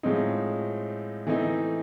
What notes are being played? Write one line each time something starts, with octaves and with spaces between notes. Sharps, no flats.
A2 F3 G#3 C4 D#4
E3 A3 C4 D#4